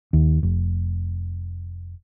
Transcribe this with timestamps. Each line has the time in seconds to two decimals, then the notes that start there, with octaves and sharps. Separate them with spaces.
0.13 D#2
0.43 F1